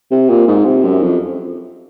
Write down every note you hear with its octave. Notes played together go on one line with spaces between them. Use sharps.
C3
A#2
G#2
C3
F#2
F2